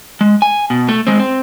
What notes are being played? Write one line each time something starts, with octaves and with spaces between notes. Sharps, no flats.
G#3
G#5
B2
A3
G#3 C4
C4